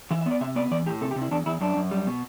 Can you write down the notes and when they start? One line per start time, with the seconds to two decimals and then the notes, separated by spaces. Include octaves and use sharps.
0.11 E3 E5
0.21 E5
0.26 B3
0.31 D5
0.41 C3 E5
0.56 B3 D5
0.71 E3 D5
0.86 A2 G4
1.01 C3 A4
1.11 G4
1.16 C3
1.21 E4
1.31 E2 D4
1.46 E2 E4
1.61 F#2 D4
1.76 F#2
1.91 G3
2.06 B2